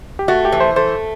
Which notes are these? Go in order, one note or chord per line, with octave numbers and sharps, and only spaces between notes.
G4
A3 F#4
G4
E3
C5
A3 C5